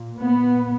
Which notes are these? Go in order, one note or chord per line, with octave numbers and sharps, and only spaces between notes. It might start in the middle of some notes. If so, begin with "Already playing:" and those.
Already playing: A#2
B3